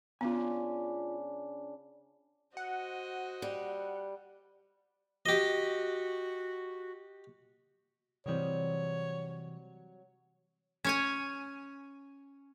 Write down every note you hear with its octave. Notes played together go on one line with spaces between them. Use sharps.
C#3 B3 D4 F4 G#5
F#4 C5 D#5 F#5
G3
F#4 G4 D#5
C3 E3 F#3 G3 C4 C#5
C#4 C#5 G#5